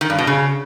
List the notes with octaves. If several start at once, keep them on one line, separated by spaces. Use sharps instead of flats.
D#3
G2
B2
C#3